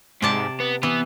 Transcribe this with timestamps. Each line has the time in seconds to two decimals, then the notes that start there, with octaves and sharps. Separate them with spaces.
0.22 G#2 C3 D5 A5
0.60 B3
0.83 E3 B3